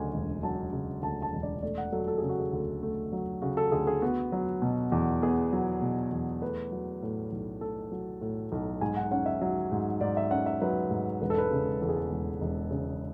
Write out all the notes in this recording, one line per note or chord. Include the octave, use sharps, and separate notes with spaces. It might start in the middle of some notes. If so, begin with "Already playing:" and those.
Already playing: D2 C#3 F#3 D5 G#5
E1
F#3 A5
C#3
D2 A5
A5
E1
D5
A3 D5
F#5
F#3 A4
A4
C#3 G#4
F#4
G#4
D2
A3
F#3
C#3 F#4
A4
D2 G#4
G#4
B3 F#4
F#3
B2
E2
B3 G#4
F#3
B2
E2
A3 B4
F#3
A2
B1
A3 A4
F#3
A2
B1
G#2 G#5
F#5
C#4 F#5
E5
F#3
G#2
G#2 D5
E5
C#4 F#5
E5
F#3 B4
G#2
E1 B4
A4
B4
C#3
E2 A4
G#4
A4
E1
E1
C#3